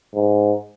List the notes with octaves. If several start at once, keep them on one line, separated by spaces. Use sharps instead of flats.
G#2